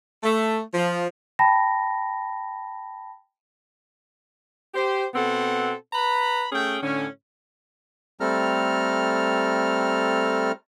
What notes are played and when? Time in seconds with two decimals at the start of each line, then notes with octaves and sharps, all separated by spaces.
0.23 A3
0.74 F3
1.39 G5 A5 B5 A#6
4.75 G4 C5
5.14 B2 B3 C4 A4 F#5
5.93 B4 A#5 B5
6.52 A3 C#4 G#4 G5
6.82 A2 D3 C#4
8.20 G3 A3 C4 A4 A#5 F6